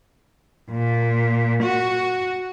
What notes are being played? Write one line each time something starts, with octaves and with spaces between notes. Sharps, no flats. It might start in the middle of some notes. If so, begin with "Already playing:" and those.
A#2
F#4